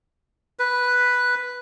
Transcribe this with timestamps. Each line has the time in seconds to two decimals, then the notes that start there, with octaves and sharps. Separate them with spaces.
0.59 B4